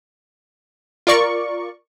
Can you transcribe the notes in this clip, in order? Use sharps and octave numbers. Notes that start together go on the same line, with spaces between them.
F4 A#4 D5 C#6